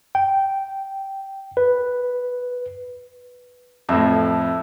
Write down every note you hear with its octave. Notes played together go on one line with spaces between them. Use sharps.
G5
B4
F2 A2 E5